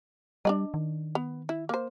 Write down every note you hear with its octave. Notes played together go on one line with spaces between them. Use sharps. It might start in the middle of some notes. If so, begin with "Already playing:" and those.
G3 D4 D5 D#5
D#3
B3
E4
A#3 C5